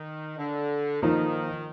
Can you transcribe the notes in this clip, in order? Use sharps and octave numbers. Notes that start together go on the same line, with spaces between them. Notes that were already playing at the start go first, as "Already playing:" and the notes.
Already playing: D#3
D3
D#3 F3 A#3 D#4